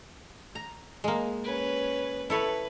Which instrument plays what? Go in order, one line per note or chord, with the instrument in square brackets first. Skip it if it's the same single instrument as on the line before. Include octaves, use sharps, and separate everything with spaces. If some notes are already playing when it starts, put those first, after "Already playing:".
[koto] A#5
G#3 A#3
[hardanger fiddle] C#4 B4
[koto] E4 A4 C#5 [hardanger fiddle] B4